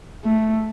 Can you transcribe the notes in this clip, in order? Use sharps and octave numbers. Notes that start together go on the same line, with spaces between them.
A3